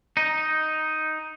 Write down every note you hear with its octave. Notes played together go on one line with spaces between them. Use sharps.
D#4